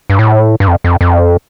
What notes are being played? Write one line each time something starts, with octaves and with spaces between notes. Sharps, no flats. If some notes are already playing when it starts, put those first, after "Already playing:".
G2
A2
G2
F2
F2
F2